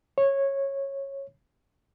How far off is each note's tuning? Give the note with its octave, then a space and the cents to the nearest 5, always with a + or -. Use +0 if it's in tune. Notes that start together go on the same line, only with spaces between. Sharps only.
C#5 -15